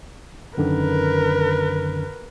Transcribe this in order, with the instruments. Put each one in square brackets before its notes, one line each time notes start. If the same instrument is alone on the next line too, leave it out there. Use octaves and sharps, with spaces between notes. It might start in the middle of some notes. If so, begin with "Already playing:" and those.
[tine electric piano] F#2 D3 D#3 [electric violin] A#4 B4